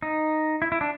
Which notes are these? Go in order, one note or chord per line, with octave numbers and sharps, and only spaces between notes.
D#4
E4
E4
D4